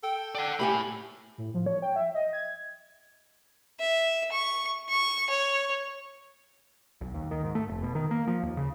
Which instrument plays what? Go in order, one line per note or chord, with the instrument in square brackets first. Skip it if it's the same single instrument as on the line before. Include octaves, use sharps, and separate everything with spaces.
[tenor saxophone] A4 [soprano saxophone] G5
[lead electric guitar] D5 F#5 [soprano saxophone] G5
[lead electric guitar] A2 B5 [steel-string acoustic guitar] A3 G4 G#5
[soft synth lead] A2
F3
C#5
G5
E5
D#5
G#6
[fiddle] E5
C#6
C#6
C#5
[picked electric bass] B1
D#2
D#3
G#2
A3
F1
B2
D#3
A#3
F3
D#2
C#3